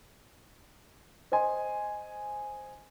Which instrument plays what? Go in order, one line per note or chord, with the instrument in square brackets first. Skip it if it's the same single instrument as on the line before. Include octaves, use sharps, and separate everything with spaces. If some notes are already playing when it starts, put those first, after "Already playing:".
[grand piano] C5 D#5 G#5 C6